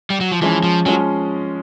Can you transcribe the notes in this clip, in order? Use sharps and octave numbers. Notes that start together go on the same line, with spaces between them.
G3
F#3
F3
E3 F3 G#3 C#4
F3
F3 F#3 G#3 C#4